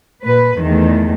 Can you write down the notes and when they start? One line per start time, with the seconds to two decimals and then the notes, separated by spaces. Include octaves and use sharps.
0.25 A#2 B4
0.59 E2 D#3 A3